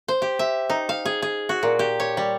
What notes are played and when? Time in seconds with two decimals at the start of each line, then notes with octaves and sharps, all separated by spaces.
0.08 C5
0.22 G4
0.39 E5
0.70 D#4
0.89 F5
1.05 G#4
1.22 G#4
1.49 F#4
1.63 A#2
1.79 G4
2.00 C#5
2.17 G3